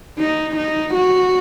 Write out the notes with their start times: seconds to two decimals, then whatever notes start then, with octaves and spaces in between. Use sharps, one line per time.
0.19 D#4
0.56 D#4
0.94 F#4